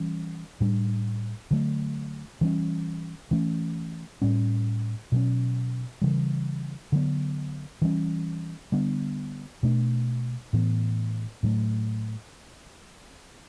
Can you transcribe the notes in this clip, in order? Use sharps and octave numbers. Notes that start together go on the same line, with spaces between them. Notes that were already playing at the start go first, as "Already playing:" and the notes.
Already playing: E3 G3 C#4
A2 G3 D4
D3 F#3 A3
E3 G3 C#4
E3 A3 C#4
A2 G3 C#4
B2 F#3 C#4
C#3 E3 G3
D3 F#3 B3
E3 G3 C#4
D3 G3 B3 D4
B2 A3 D4
A2 E3 B3
A2 F#3 A3